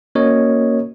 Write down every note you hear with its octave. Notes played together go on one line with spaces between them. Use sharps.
A#3 C#4 F#4 A#4 C#5 D#5